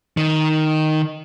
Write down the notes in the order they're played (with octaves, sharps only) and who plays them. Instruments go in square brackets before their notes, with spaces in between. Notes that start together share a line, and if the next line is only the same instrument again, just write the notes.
[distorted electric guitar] D#3